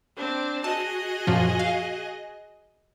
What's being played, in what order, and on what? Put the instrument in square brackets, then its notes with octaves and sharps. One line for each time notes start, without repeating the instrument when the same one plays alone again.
[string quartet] C4 D4
[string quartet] F#4 G#4 D#5 [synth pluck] A5
[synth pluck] F#2 A#2 F3
F5